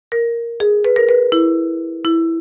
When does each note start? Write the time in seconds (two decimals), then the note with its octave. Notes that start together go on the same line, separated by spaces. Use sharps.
0.12 A#4
0.60 G#4
0.85 B4
0.96 A#4
1.09 B4
1.32 E4
2.05 E4